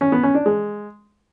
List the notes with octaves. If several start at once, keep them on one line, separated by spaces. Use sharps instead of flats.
C#4
B3
C#4
D4
G#3